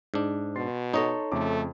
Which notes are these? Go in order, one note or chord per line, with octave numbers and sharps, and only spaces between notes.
G#2 D4
B2 C6 A6 C7
D#4 A4 C#5 D#5
F2 C#3 A3 D6